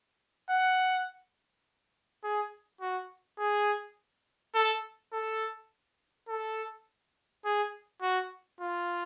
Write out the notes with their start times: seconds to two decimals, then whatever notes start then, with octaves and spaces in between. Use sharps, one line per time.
0.50 F#5
2.24 G#4
2.81 F#4
3.39 G#4
4.55 A4
5.13 A4
6.28 A4
7.45 G#4
8.02 F#4
8.60 F4